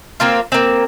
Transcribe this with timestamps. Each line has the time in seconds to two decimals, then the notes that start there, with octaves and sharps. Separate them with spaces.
0.20 A#3 C4 F4
0.52 A#3 C4